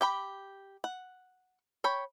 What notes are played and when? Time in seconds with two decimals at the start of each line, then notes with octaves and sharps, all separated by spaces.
0.01 G4 G5 B5
0.84 F#5
1.84 C#5 G5 B5